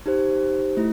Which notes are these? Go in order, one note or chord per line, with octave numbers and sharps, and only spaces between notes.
D#4 G4 C5
A3 E4